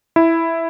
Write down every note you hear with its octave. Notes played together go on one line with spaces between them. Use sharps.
E4